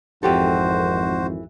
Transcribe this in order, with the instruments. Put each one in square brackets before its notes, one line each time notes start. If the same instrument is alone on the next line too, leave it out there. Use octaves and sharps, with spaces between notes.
[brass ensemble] G#1 F2 [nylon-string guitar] E3 G4 A4 [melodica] F#4 C5